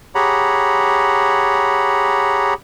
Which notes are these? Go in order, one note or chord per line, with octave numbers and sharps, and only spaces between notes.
G4 G#4 C#5 F#5 A#5 B5